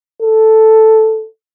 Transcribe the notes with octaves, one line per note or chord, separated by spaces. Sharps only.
A4